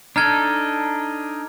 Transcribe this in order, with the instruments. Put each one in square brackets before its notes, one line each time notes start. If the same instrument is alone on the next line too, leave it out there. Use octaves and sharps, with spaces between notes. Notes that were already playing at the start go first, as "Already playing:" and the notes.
[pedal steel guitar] D4 D#4 A4 [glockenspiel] A#5 F6 G#6